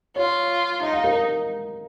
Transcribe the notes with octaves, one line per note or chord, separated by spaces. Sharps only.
F4 C#5
D#4 D#5
F5
A#4